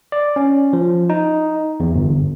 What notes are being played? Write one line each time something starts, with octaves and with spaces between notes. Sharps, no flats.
D5
C#4
F3
D#4
E2
G1